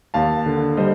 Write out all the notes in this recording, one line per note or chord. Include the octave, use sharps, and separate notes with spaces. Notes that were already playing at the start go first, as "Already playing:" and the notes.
D#2 F5 A5
D3
G3 C5 D#5